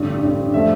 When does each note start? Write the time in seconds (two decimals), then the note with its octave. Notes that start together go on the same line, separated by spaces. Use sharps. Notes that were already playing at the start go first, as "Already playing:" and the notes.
Already playing: A1 G2 D3
0.22 A1 G2 D3
0.54 A2 F3 A3 E5